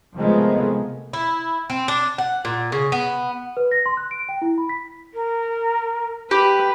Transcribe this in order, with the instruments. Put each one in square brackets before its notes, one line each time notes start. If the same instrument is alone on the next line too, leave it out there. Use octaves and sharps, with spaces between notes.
[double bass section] C3 D#3 F3 G#3 A3 B3
[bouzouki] E4
C4
D4
F#5
A#2
C#3
B3
[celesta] B4
A#6
C6
F#6
D7
G5
E4
B5
B6
[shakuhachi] A#4
[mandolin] G4 [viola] B4